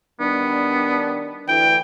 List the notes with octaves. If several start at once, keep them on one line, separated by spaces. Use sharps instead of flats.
D#3 G3 B3 D4
D2 E3 G5